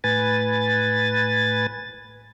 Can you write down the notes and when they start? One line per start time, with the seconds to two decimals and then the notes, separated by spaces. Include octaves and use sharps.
0.04 A2 B4 G#5 A6